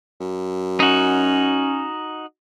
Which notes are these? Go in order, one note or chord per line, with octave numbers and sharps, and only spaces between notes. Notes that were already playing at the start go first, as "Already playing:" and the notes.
F#2
C#4 D#4 F#4